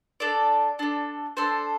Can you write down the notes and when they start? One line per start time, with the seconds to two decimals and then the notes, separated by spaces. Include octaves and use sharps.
0.20 D4 A4 D5
0.79 D4 A4
1.37 D4 A4 C5